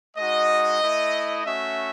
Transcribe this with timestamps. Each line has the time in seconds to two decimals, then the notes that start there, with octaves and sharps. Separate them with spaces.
0.17 G#3 D#4 F#4 D#5
0.81 A3 E4
1.45 A3 C#4 F#4 E5